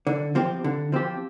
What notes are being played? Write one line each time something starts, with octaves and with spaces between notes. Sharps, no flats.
D3
F3 C4 G4
D3
F3 C4 G4